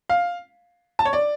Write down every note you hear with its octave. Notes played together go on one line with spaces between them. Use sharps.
F5
A5
C#5
D5